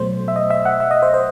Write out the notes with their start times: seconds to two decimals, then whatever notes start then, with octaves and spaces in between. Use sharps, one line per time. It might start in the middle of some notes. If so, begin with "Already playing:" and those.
Already playing: B2 F#3 A3 C5
0.28 E5
0.36 D#5
0.50 E5
0.65 F#5
0.80 E5
0.91 D#5
1.02 C5
1.14 C5